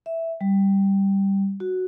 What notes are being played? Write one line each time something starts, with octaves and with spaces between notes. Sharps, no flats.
E5
G3
F#4